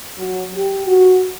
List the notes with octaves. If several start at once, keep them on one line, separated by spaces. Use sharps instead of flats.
F#3
G4
F#4